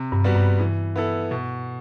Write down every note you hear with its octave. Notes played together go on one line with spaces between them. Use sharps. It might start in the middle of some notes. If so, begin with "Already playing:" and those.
Already playing: C3
G2
G3 B3 F#4
G2
E3
B3 E4 A4
B2